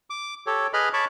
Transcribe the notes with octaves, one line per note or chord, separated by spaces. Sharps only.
D6
G4 A4 C#5
G#4 B4 D#5 B5 F6
C#5 A5 B5 C#6 D6